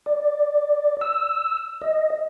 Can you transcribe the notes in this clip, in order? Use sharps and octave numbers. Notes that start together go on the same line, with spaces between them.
D5
E6
D#5